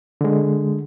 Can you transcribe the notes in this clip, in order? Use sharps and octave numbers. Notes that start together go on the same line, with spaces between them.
D3 G#3